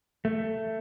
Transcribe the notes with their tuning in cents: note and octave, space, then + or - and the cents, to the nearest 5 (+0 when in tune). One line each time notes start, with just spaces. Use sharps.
A3 +10